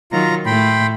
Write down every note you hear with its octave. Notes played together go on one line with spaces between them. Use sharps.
D#3 F#3 F4 A#5
A2 A3 G5 B5 C6